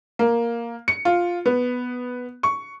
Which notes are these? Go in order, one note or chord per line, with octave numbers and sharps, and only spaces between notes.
A#3
C#7
F4
B3
C#6